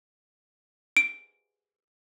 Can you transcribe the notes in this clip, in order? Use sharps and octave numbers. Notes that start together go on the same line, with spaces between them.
D7